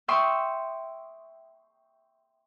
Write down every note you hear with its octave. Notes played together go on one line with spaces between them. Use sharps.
E5 G5 C6 C#6 D#6